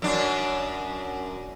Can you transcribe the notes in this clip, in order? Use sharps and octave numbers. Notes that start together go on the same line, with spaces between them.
F#2 D4